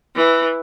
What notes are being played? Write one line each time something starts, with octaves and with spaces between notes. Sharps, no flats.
E3